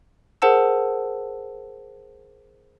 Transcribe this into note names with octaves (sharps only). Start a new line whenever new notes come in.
G#4 A#4 C5 F#5 A5 E6